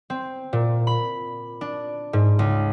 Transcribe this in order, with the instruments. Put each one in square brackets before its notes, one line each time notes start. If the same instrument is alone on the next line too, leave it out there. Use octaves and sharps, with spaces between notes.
[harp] C4
A#2
B5
D4
G#2
C#2